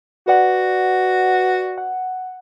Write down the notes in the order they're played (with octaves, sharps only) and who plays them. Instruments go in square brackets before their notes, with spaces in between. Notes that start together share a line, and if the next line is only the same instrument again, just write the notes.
[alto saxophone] F#4 [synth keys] B4 D5 F#5
[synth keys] F#5